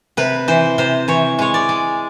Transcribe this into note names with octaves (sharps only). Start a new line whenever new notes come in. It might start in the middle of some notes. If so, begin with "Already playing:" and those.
C3 B4
E3 C5
C3 C5
E3 C#5
G#3 C#5
D5
G#3